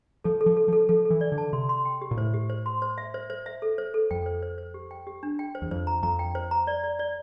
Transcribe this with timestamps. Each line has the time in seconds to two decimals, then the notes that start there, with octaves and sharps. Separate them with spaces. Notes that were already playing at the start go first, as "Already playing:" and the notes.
0.24 F3 A4
0.41 A4
0.46 F3
0.57 A4
0.68 F3 A4
0.89 F3 A4
1.05 A4
1.10 E3
1.21 D5
1.32 D3
1.38 A5
1.53 C3 C6
1.69 C6
1.85 G5
2.01 G4
2.11 A#2
2.17 A2 C5
2.34 G4
2.50 C5
2.66 C6
2.82 C5
2.98 E5
3.14 C5
3.30 C5
3.46 E5
3.62 A4
3.78 C5
3.94 A4
4.11 F2 G5
4.26 C5
4.42 C5
4.58 C5
4.74 G4
4.91 G5
5.07 G4
5.23 D4
5.39 G5
5.55 C5
5.62 E2
5.71 F2 C5
5.87 A#5
6.03 F2 A#5
6.19 G5
6.35 C5
6.51 A#5
6.67 D5
6.83 D5
6.99 D5